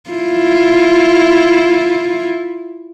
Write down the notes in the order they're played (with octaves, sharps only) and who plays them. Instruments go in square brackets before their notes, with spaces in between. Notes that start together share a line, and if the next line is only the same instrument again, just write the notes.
[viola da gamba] E4 F4